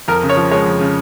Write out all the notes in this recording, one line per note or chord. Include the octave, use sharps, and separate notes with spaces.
F2 A#4
C#3
C#5
F3
G#3 C#5
F2
C#3